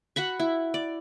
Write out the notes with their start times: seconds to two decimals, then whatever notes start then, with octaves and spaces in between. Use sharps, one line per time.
0.16 F#4 F#5 B5 C#6
0.40 E4
0.74 D5